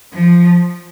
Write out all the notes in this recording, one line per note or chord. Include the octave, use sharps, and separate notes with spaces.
F3